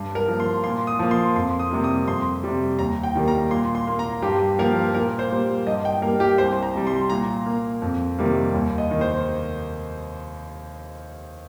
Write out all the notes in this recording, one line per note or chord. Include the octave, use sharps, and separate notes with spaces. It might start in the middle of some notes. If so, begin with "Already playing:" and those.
Already playing: G2
A#4
F3 A#3
C6
A#2 C6
D#6
F3 A#3
C6
F2 C6
D#6
C3 G3 A#3
D#6
F2 C6
C3 G3
D#2 A#5
G5
D#3 G3 A#3
A#5
A#2 C6
C6
A#3
A#5
G2 G4
F3 A#3 A#4
A#2 A#4
C5
G3 A#3
G2 D#5
G5
G3 A#3 A#4
G4
C2 C5
A#5
C3 G3
C6
A#2 A#5
A#3
F2
C3 D#3 G3 A#3
D#2
D#5
D#3 A#3
C5